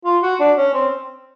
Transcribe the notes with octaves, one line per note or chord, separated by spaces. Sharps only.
F4
F#4
D4
C#4
C4